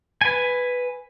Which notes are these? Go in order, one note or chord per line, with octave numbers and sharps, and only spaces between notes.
B4 G#5